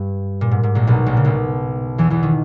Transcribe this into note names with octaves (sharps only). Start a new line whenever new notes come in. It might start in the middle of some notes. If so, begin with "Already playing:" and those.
Already playing: G2
A#2
G#2
G#2
A#1 A#2
B1 B2
A#1 A#2
C#3
B1 B2
E2 E3
E2 E3
D#3